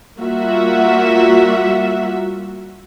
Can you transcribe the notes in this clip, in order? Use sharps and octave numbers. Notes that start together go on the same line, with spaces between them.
G3 A#3 F4 F#4 E5